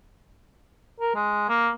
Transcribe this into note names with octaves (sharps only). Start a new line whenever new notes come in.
A#4
G#3
A#3